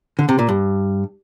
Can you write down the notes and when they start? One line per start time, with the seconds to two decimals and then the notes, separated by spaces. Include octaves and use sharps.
0.19 D3
0.29 C3
0.39 A#2
0.49 G2